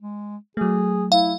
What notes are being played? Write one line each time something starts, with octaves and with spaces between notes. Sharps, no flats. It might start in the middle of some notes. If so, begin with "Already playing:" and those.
G#3
F#3 A3 G#4
E4 F5